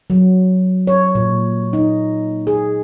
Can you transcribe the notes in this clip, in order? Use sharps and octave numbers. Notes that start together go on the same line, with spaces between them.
F#3
C#5
A#2
D#4
G#4